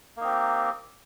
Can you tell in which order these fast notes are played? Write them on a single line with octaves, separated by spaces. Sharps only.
A#3 D#4 C4 G4